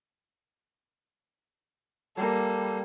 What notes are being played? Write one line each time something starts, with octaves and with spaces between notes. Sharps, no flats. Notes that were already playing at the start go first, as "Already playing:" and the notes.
G3 A#3 A4